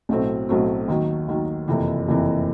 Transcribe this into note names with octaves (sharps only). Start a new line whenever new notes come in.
B1 A2 F#3 A3 C4
B1 A2 F#3 A3 C4
D#2 D#3 F#3
D#2 D#3 F#3
F#1 F2 C3 E3
F#1 F2 C3 E3